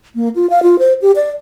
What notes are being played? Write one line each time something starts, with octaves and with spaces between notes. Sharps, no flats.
A#3
F4
F5
F4
C5
G4
D5